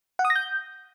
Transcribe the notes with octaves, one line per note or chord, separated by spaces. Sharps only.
F#5
D#6
A#6
G6